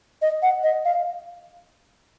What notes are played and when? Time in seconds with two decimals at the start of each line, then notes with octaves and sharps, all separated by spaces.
0.22 D#5
0.42 F#5
0.63 D#5
0.85 F5